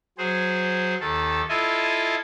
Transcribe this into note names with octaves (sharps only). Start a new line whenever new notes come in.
F#3 G#4 C5
D#2 D#3 A4
E4 F4 A4 D#5 G#5